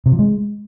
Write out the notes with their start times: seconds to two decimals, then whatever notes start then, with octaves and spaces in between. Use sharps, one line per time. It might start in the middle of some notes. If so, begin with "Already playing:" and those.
0.06 C3
0.12 F3
0.19 G#3